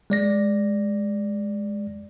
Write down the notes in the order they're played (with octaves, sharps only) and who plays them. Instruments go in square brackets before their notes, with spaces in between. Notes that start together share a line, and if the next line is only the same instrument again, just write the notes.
[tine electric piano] G#3 D5 A#6